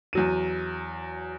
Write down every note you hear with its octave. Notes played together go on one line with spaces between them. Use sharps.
E2 F#3 D#7